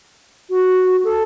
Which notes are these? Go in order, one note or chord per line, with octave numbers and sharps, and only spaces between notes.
F#4
A4